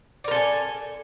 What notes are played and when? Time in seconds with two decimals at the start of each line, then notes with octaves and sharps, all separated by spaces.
0.24 D5
0.28 A#4
0.31 A4
0.35 G#5